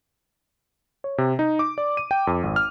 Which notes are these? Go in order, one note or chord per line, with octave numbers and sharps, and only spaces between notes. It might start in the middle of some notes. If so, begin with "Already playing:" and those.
C#5
C3
D#4
D6
D5
D#7
G5
F2
G#1
F6